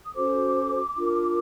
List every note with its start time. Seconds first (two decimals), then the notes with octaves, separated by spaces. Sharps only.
0.06 D#6
0.15 C#4 F#4 A4 C5 D6
0.96 D4 F4 A#4